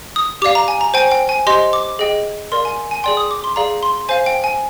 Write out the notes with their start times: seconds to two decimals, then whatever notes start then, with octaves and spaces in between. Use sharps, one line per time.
0.16 D#6
0.42 G4 D5 F5 D6
0.55 A#5
0.68 G#5
0.81 A#5
0.94 C5 G5 G#5
1.12 G5
1.29 G#5
1.47 G4 C5 D#5 C6
1.73 D6
1.99 G#4 D#5 G5
2.52 A#4 D5 F5 C6
2.65 G#5
2.91 G#5
3.04 G#4 D5 G5 C6
3.17 D#6
3.31 D6
3.44 C6
3.56 G#4 D5 F5 A#5
3.83 C6
4.09 C5 F5 G#5
4.26 G5
4.44 G#5